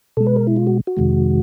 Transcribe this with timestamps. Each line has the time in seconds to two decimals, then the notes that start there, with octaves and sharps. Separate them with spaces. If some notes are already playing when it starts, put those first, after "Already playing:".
0.17 B2 G#3 A4
0.27 B4
0.36 A#4
0.47 E4
0.56 F4
0.67 F#4
0.87 F#4
0.97 F2 C3 D#3 G#3